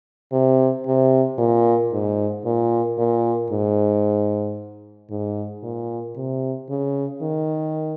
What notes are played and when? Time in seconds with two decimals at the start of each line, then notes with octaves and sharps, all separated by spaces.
0.32 C3
0.86 C3
1.38 A#2
1.92 G#2
2.45 A#2
2.98 A#2
3.51 G#2
5.10 G#2
5.63 A#2
6.16 C3
6.69 C#3
7.22 D#3